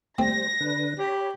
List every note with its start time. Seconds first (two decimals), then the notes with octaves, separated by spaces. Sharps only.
0.18 G3 A3 C4 C5 A#6
0.61 D3 D4 B4
0.99 G4 C#5 B5